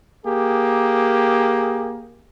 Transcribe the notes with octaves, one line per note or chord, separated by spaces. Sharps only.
A#3 G4 G#4